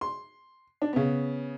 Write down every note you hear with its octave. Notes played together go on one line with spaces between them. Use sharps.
C6
D4
C#3 B3